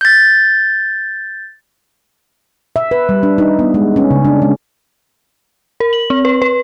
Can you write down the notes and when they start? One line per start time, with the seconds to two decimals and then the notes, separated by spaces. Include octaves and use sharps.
0.01 G6 A6
2.76 E5
2.91 B4
3.09 G3
3.23 D4
3.38 D#4
3.59 B3
3.74 G#3
3.96 C#4
4.11 C#3
4.25 D4
4.42 G#3
5.80 A#4
5.93 F#7
6.10 C4
6.25 B4
6.42 B4